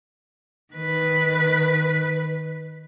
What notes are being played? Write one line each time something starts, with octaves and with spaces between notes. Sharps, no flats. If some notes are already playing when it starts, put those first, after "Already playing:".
D#3 B4